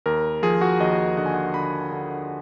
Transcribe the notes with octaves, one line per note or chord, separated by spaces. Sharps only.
D#2 A#4
F3 G#4
F#4
D#2 D#5
D3 F#5
G#5
F#5
D3 B5
D3